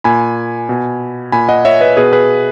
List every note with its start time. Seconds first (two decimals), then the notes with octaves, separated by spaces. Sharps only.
0.04 A#2 G#5 B5
0.69 B2
1.32 A#2 G#5 B5
1.49 D#5 F#5
1.65 C#5 E5
1.80 B4 D#5
1.97 B2 G#4 B4
2.13 G#4 B4